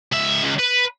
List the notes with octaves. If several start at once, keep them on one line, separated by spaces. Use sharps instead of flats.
C#2 E5
C#2
B4